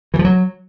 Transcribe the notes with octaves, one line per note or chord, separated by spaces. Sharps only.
E3
F3
F#3